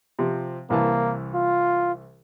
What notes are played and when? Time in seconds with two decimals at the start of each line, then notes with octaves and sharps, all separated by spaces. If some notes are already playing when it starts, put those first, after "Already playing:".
0.19 C3 F3 C4
0.70 C2 E3 A#3 A5
1.34 F4